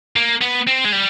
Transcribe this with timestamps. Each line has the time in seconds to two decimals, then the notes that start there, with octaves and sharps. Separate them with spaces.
0.16 A#3
0.42 B3
0.68 C4
0.85 G#3
0.93 G3